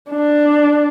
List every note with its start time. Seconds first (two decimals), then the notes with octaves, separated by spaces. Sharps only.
0.10 D4